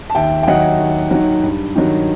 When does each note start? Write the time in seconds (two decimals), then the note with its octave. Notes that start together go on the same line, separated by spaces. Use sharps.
0.10 A5
0.15 D#2 E5 G5
0.43 G5
0.47 D#3 F#3 D#5 F#5
0.79 D#2
1.11 D#3 F#3
1.43 G2
1.76 D#3 F#3